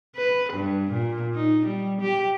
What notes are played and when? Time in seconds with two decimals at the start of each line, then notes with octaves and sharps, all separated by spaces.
0.16 B4
0.53 G2
0.91 A#2
1.36 D#4
1.66 G3
2.02 G4